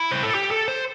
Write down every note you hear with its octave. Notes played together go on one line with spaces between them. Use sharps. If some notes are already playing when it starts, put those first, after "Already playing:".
Already playing: E4
C5
A4
G4
A4
C5